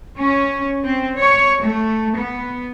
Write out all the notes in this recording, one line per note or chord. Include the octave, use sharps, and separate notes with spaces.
C#4
C4
C#5
A3
B3